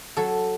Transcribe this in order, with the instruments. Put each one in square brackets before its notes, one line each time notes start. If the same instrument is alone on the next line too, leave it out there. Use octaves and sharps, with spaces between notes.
[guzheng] F#3 A4